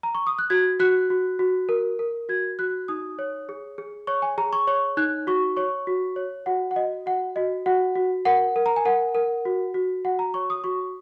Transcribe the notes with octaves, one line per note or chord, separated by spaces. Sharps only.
A#5
C#6
D#6
F#6
F#4 G#6
F#4 F#6
F#4
F#4
A#4
A#4
F#4 G#6
F#4 F#6
D#4 D#6
C#5
G#4
G#4
C#5 C#6
G#5
G#4 A#5
C#6
C#5 C#6
D#4 F#6
F#4 C#6
C#5 C#6
F#4
C#5
F#4 F#5
F#5
F#4 D#5
F#4 F#5
F#4 D#5
F#4 F#5
F#4
A#4 F#5
A#4
A#5
G#5
A#4 F#5
A#4
F#4
F#4
F#4 F#5
A#5
C#5 C#6
D#6
F#4 C#6